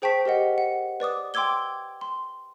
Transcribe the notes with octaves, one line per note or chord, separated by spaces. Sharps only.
G#4 C5 G5 A5 C#6 B6
G4 A#4 D#5 F#5
F#5
B4 D5 D6 D#6
G5 C6 D6 E6 G#6 G7
C6